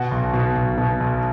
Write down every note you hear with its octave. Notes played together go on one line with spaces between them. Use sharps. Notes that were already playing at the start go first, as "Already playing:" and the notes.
Already playing: B2 F#4
B1
B2
B1
B2
B1